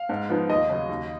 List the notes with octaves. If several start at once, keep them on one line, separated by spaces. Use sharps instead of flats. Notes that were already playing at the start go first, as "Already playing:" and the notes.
Already playing: F5
G#2
F3 B3 D#4
D#2 D#5
C#3 F#3
D#2